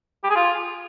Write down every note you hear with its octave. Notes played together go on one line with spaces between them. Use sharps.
G4
G#4
F4